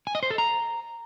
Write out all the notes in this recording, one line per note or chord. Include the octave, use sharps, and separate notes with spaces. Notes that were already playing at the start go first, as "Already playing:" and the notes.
G#5
D#5
C5
A4
A#5